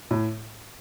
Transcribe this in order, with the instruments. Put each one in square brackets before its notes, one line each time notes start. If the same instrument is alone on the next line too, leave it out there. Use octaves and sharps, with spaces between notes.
[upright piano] A2